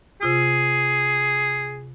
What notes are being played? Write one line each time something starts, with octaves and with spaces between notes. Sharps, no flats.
C3 F4 G#4 D#6